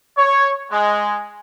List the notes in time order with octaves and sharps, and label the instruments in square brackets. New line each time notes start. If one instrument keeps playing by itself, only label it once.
[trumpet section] C#5
G#3